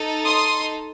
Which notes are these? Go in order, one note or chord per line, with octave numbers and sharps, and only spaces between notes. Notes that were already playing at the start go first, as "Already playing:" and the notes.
Already playing: D#4 A4
C6 D#6